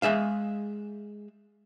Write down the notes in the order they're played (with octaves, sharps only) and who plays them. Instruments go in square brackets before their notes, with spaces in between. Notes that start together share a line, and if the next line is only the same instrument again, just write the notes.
[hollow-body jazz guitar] G#3 G#4 E5 F5